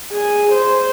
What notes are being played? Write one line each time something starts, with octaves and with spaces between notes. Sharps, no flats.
G#4
C5